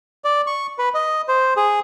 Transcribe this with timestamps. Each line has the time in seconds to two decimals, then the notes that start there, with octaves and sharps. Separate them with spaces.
0.24 D5
0.47 C#6
0.79 B4
0.94 D#5
1.28 C5
1.57 G#4